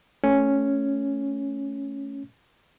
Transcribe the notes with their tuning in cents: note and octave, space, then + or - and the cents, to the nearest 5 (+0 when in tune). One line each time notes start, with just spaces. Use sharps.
A3 +0 C#4 +0